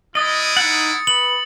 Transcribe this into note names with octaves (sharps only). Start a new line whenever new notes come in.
G#3 E4 D#5 D#6 A6
D#4 F#5 A6 C#7
B4 F#7